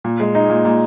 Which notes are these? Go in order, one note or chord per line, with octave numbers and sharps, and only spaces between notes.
A#2
G#3
D#4
A#2
A#2